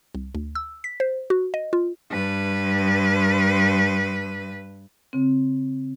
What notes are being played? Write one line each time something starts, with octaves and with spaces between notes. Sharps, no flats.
C2
D2
E6
B6
C5
F#4
D#5
F4
G2 B4
C#3 C4